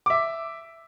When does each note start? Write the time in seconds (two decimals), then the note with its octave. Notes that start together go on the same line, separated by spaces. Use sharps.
0.06 E5 D6